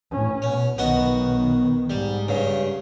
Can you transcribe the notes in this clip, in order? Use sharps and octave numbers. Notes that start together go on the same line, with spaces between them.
A2 C#4
B2 C#4
B1 D#3 B3 F#4 D#5
G#2 G3
G2 C#3